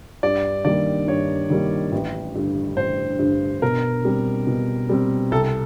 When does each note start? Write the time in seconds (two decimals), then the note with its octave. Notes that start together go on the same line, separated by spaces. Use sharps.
0.23 G2 D5
0.65 D#3 G3 A#3 D5
1.07 G2 C#5
1.50 D#3 G3 A#3
1.92 A1
2.35 G2 D3
2.77 A1 C5
3.19 G2 D3
3.62 B2 A#4
4.05 G3 C4
4.47 B2
4.89 G3 C4
5.31 C2 A4